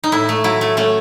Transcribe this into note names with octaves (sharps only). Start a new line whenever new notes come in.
D#4
A2 E4
A3
F#3 E4
A3
A3 C#4